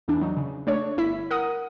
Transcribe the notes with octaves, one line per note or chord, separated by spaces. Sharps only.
E2 E3 D4
F#3 D#4
C#3
A3 D4 C#5
G1 E4 B6
A#4 F#5 D#6